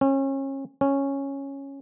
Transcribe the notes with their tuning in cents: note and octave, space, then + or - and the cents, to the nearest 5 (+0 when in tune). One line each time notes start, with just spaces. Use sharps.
C#4 -30
C#4 -5